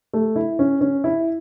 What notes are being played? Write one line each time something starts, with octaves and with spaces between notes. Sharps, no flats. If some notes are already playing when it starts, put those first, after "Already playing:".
A3
E4
C#4
C#4
E4